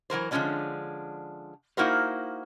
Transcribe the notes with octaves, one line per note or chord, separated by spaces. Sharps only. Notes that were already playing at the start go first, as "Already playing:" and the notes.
E3 F#3 A#4 C5
D3 F3 F#3 G#3 C#4 D4
A#3 D#4 E4 F#4 A#4 C5